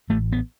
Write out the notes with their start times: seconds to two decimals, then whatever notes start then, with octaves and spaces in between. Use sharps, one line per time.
0.10 A1 A3
0.32 B3